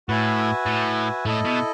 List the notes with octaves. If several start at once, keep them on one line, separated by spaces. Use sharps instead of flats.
A2 F#4 B4 E5 G#5
A2
A2 E4 A4 D#5
B2